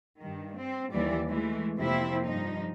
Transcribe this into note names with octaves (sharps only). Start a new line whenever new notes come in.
G2 D#3
C4
D#2 E3 G3 D5
E3 G#3 A3
F2 C3 A#3 C4 E4
G2 F3 D#4